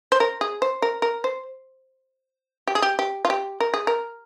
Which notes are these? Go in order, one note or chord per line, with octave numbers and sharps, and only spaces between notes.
C5
A#4
G#4
C5
A#4
A#4
C5
G4
G#4
G4
G4
F4
G4
A#4
G#4
A#4